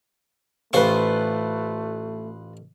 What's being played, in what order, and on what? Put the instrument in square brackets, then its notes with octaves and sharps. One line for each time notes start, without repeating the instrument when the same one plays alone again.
[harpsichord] A1 C5 C#6 [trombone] A3 [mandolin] F4 B4